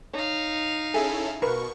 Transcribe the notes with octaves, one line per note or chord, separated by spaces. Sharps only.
D#4 C#5 F5
C#4 E4 G#4 A4 E5 G#5
B2 A#4 B4 C#6